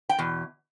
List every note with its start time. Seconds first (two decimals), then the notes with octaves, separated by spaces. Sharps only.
0.09 G5
0.18 E2 B2